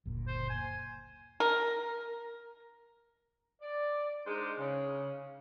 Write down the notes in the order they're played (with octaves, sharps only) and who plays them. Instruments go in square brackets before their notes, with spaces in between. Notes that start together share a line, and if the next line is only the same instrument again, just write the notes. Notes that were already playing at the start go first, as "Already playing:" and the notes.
[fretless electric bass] F#1 D2 A#2
[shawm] C5
G#5
[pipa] A#4
[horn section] D5
G#3 D4 D#4 A#4 C5
C#3